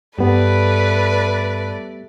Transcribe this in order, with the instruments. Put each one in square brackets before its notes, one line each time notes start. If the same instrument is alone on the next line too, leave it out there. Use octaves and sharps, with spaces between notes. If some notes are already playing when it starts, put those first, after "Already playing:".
[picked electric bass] G2 [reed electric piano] G3 B3 G4 [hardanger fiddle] A3 D5 [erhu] B4